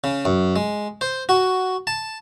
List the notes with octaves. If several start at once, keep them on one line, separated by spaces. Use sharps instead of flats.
C#3
F#2
G#3
C5
F#4
A5